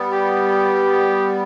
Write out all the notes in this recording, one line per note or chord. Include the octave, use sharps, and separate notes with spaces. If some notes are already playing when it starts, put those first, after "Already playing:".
Already playing: G3 B3
G4